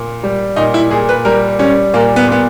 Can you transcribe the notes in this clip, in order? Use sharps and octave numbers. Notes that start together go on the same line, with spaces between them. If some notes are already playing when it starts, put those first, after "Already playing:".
Already playing: A#2
G3
A#2 D#4
E4
A#2 G#4
B4
G3 A#4
G3 C#4
A#2 A#3
B3
A#2 B3